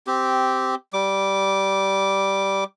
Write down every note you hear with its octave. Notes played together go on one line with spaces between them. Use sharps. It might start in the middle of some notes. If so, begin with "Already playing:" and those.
C4 G4
G3 D6